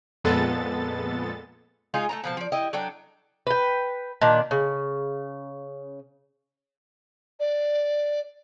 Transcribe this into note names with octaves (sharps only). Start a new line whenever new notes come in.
F2 A#2 G#3 B3 A4 A6
G#3 D#4 F4 G#4
A3 A5 A#5
B2 F3 A5
F3 D5
E4 G4 D#5
F#3 D4 A4 G5
B4 G5
A#2 D#3 D4
C#3
D5